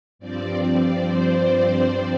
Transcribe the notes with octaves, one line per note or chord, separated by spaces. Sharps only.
G2 F3 C4 D5
C5
C5